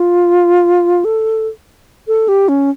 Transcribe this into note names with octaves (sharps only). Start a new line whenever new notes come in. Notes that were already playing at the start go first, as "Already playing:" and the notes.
Already playing: F4
A4
A4
G4
C#4